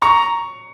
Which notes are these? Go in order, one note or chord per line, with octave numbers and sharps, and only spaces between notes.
A#5 C#6